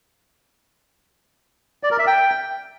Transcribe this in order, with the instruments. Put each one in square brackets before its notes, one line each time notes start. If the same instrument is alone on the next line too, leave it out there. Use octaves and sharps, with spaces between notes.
[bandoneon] D5
A#4
E5
G5